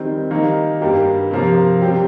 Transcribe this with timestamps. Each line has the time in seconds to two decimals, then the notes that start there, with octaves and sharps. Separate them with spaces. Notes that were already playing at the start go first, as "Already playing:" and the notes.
Already playing: D#3 G3 C4
0.31 D#3 G3 A#3
0.81 G2 G3 A#3 G4
1.31 C3 F3 A#3
1.81 C3 G3 C4 G4